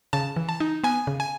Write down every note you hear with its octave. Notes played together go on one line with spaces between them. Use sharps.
C#3 A5
E3
A5
D#4
B3 G#5
C#3
G#5